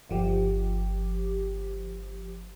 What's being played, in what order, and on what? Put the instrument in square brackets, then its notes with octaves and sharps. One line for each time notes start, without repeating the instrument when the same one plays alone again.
[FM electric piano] G1 F3 G4